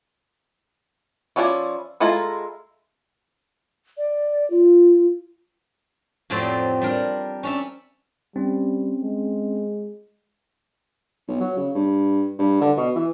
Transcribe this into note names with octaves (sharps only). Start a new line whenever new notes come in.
F3 C#4 E4 G#4 D5
G#3 E4 F4 A4 A#5
D5
F4
F2 A2 F#3 C4 G4 D5
G3 D4 A#4
C#4 D4 E5
G3 C4 C#4
G#3
B1
F#3
C#3
G2
G2
D3
B2
E3